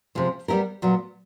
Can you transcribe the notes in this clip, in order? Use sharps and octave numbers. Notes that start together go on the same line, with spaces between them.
C3 F3 G#3
G3 B3 E4 G4 A#4
A#2 F#3 B3